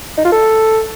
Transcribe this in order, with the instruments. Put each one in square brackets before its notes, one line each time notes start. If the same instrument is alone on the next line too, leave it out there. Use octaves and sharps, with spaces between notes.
[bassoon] D#4
F4
A4